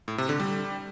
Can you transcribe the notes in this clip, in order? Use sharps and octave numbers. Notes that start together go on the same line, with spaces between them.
A2
C3
D3
G3